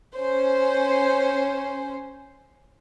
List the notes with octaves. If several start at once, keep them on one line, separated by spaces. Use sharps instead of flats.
C#4 C5